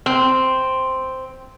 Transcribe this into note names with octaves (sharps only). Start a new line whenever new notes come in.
C4